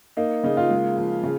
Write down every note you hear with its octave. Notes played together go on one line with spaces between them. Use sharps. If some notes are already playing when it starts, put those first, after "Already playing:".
A#3 D#4
C#3 D#4
F4
G#3
F3
C#3